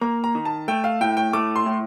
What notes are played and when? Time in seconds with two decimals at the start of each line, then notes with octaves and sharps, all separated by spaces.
0.01 A#3 A#5
0.24 A#5
0.35 D#3
0.45 A5
0.68 A3 G5
0.84 F5
1.01 A2 G5
1.17 G5
1.33 A3 D6
1.56 C6
1.66 A2